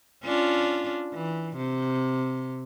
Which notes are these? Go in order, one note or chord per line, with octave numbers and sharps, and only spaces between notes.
C#4 D4 F4
E3
C3